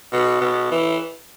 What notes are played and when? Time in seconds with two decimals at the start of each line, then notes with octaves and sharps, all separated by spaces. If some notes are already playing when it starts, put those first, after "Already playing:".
0.12 B2
0.41 B2
0.71 E3